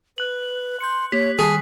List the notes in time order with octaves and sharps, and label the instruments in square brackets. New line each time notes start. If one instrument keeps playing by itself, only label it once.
[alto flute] B4 [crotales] F#6 F#7
[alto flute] C6 [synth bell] G6 C#7
[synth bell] A#3 G4 [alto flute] C#5 [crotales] B6
[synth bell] D#3 G3 C7 [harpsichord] G#4 [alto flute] A5